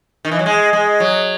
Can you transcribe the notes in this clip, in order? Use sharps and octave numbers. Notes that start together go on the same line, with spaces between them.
D#3
E3
F#3
G#3
G#3
F#3